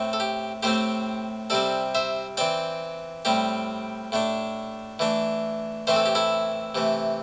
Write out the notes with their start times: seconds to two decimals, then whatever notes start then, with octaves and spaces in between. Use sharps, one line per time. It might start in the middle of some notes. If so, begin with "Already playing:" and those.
Already playing: A2 A3 C4
0.13 A4
0.20 G4
0.63 A2 A3 C4 G4 C5
1.50 C3 G3 C4 A4 D5
1.95 C5 E5
2.37 E3 C4 D5 G5
3.25 A2 G3 C4 G4
4.12 A2 A3 D4
4.99 E3 A3 D4
5.87 A2 E3 A3 C4 C5
5.96 A4
6.06 G4
6.15 E4 A4
6.75 C3 E3 A3